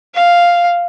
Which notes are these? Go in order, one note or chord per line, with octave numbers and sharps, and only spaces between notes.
F5